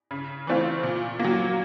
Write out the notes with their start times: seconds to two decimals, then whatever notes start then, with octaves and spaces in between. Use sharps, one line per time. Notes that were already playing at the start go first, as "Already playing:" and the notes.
0.11 C#3
0.47 E3 A3 C4 F4
0.83 A#2
1.19 F#3 A#3